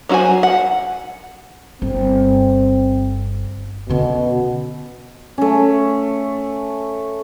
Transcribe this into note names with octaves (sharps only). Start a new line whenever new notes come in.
F#3 D#4 F#4 C5 G#5
F#5
G1 C4
B2 D3 C#4
A3 C#4